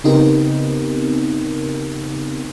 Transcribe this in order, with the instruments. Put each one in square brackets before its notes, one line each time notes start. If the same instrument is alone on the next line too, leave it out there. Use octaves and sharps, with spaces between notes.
[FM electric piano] C#3 B3 C4 D#4 G4 A#4